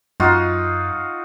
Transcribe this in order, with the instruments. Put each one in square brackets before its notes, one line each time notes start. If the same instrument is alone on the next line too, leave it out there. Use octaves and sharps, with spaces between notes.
[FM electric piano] F#2 [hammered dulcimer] D#4 F4 F#4